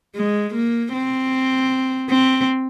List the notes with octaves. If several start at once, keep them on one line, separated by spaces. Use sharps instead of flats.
G#3
A#3
C4
C4